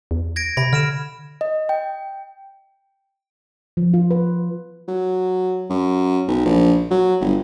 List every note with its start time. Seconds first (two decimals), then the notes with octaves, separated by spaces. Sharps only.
0.11 E2
0.36 G#6 A#6 D7
0.57 C3 B5 A#6
0.73 D3 F6 D7 E7
1.41 D#5
1.69 G5
3.77 F3
3.94 F4
4.11 B4
4.88 F#3
5.70 F#2
6.28 B1
6.45 A#1
6.91 F#3
7.21 G1